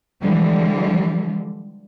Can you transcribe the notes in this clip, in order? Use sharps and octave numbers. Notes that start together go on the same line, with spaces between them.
D3 E3 F3 G3 G#3